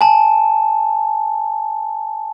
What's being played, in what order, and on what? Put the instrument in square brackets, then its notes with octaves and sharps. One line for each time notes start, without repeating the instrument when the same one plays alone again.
[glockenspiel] G#5 A5